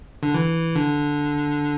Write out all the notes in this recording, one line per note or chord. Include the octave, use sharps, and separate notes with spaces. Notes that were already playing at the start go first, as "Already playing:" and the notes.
D3
E3
D3